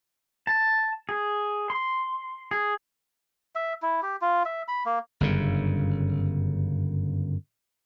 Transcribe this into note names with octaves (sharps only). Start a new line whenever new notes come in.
A5
G#4
C6
G#4
E5
E4
G4
F4
E5
B5
A#3
G1 F#2 C#3